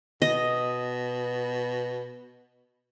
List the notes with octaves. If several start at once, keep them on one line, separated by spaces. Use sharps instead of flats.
B2 D#5